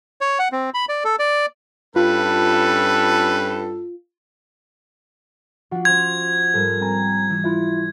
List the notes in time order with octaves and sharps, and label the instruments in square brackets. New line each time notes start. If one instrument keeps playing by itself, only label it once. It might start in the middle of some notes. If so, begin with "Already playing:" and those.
[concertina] C#5
F#5
C4
B5
D5
A4
D5
[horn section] G2 C#4 A4 [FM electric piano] F4 [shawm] B4
[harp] F3 D4 [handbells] F#4 F#5
[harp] C#4 C5 C6 [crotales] G#6
[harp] G#2 G3 [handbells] A4 A#4
[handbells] C4 G#5 A#5
[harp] E3
[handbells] E4 F4 E5